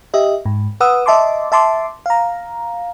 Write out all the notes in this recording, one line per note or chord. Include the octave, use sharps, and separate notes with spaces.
G4 D#5 E5
G#2
B4 F#5 D#6 E6
D#5 E5 A5 C6 D6
E5 A5 C6 D6
F5 A#5